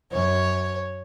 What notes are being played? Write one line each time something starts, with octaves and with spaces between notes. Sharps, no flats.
F#2 C#5